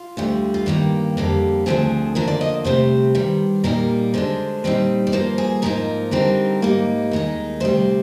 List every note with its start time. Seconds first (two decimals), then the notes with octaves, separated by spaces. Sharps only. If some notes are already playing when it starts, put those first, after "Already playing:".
Already playing: F4
0.17 D2 D3 G3
0.54 F4
0.66 G2 D#3 A#3 G4
1.17 F2 D3 G3 A#3
1.66 D2 D3 F3 C4 G#4
2.15 D3 F3 A#3 A#4
2.28 D5
2.41 D#5
2.64 D2 C3 G3 C5
3.15 G2 D#3 G3
3.64 A#2 G3 A#3 D#4 A#4
4.14 D3 G#3 D4 C5
4.64 A#2 G3 C4 D#4
5.07 D5
5.12 G2 F3 A#3 C5
5.38 G#4
5.62 G#2 F3 A#3 D#4 A#4
6.11 D3 G3 C4 D#4 A#4
6.62 G#2 G3 A#3 D#4
7.11 D#2 D#3 G#3 D#4
7.60 D2 C3 G3 C5